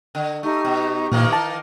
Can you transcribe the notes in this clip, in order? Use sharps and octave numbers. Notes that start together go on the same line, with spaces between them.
D3
A3 D#4 G4 C#6
B2
A#2 D#3 E3 A#3
A5